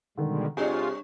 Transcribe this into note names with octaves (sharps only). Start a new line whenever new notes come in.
B2 D3 D#3 G3 G#3
C3 G3 D4 F4 G#4 C#5